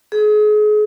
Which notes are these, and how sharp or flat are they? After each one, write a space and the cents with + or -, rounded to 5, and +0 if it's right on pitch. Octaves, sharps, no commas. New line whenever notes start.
G#4 +35